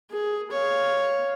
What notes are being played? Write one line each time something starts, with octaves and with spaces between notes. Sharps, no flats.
G#4
C#5 F5